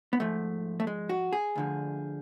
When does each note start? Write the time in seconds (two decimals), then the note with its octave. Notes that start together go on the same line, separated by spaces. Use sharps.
0.13 B3
0.20 G#2 F3 A3
0.80 A3
0.87 G#3
1.09 F#4
1.33 G#4
1.56 D2 D3 F3